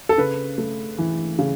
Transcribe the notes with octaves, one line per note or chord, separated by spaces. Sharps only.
A4
C#3 B4
A3
E3
C#3